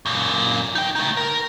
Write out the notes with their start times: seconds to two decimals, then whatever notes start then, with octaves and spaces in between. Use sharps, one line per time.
0.06 F#2 A#2
0.75 D#4 G5
0.96 A3 D#4
1.17 A#4